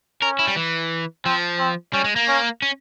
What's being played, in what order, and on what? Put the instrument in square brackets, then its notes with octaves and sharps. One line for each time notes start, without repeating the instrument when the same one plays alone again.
[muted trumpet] C#4 [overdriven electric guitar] A#4
[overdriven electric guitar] E4
G3
E3
[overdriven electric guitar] F3 [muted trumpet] C4
[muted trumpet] C4
[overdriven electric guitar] G3 [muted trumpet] C#4
[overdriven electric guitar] G#3
A#3
[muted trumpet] C#4
[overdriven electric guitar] C#4